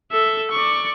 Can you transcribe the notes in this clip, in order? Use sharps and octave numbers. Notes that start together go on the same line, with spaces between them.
A4 E5
D5 C#6